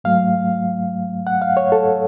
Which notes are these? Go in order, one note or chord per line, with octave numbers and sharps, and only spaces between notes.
G#2 F#3 A3 F5
F#5
F5
C#5
A4